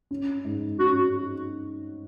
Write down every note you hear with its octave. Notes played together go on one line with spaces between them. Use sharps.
C#4
G#2
C#4 F#4